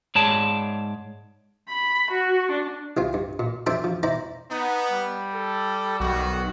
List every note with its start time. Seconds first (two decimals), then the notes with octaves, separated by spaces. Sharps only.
0.15 G#2 G#4 C#5 D5 A5
1.68 B5
2.11 F#4
2.52 D4
2.97 C2 C4 F4
3.14 G2
3.39 A#2
3.66 F2 D4 C5 E5 A5 D6
3.84 F3
4.03 E4 C5 D5 A5 A#5
4.51 B3 D#4
4.91 G3
5.34 A4
6.00 B1 D#3 F#4